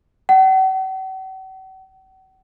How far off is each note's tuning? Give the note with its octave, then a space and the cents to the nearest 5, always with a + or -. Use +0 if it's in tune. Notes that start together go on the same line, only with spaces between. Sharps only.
F#5 +45